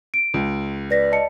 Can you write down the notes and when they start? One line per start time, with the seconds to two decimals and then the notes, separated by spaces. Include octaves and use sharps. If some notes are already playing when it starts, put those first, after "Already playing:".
0.14 D7
0.34 C#2
0.90 B4 D5 A#6 B6
1.12 D#5 A5 C#7